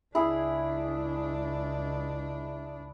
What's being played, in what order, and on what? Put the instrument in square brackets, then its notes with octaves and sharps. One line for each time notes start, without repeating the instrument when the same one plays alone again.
[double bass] C#2 D4 [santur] E4 G#4